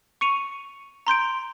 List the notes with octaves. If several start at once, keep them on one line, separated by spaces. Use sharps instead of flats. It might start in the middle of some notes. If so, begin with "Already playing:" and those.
C#6 C#7 D#7 F7
A#5 C6 G6 D7